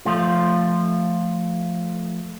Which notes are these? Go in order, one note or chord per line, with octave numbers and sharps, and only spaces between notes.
F3 A3 F4